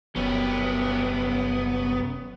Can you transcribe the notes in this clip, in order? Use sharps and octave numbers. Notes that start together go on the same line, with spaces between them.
F1 C2 F#2 B3 C#4 G4